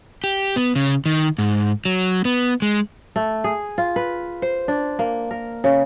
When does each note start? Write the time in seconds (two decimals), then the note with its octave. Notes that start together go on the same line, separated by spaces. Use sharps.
0.24 G4
0.56 B3
0.76 C#3
1.06 D#3
1.38 G#2
1.85 F#3
2.25 B3
2.62 G#3
3.16 A3
3.44 G#4
3.78 F4
3.96 B4
4.42 C5
4.68 D4
4.99 A#3
5.31 A#4
5.64 C#3